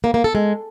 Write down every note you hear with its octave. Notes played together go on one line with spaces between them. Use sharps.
A#3
A#3
A4
G#3